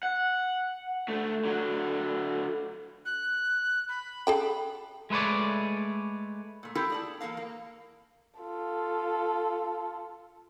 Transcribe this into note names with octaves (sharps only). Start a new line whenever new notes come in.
F#5
D2 A3
D3 F#3
F#6
B5
G#4 A4 G5
G#3 A3 B4 C#5 D5
A#2 A3
C4 E4 F4 G4 A4 A#4
G#4 D5 A5
E2 A#3 A4 A#4 F5
A#3
F4 A4